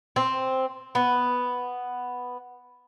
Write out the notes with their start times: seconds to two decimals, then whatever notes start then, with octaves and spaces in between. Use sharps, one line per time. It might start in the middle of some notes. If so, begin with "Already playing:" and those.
0.16 C4
0.95 B3